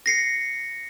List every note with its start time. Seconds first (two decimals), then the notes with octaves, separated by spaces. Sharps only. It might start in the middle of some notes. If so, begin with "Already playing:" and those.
0.06 A#6 C7 C#7